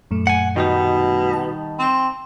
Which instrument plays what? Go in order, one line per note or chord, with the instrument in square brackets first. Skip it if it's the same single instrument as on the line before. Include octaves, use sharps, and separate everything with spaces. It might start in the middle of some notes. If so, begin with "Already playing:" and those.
[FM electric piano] F#2 A#2 A3
[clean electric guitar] F#5 G#5
[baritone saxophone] B2 [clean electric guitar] D#3 G3 D#4
[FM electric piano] A5
[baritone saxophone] C4